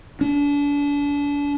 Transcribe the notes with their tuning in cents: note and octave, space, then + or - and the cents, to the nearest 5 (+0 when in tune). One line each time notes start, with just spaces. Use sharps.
D4 -35